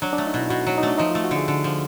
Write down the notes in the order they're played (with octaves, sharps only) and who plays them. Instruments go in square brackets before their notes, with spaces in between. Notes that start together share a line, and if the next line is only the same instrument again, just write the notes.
[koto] F#3 [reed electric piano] D4
[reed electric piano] D4
[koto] A3
[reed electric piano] D#4
[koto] B2 [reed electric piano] E4
[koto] B2 [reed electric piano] F#4
[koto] F#3
[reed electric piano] D#4
[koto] A3 [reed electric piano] D4
[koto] F3 [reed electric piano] D#4
[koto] A3 [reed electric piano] F4
[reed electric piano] F#4
[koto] D3
[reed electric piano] G#4
[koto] D3
F3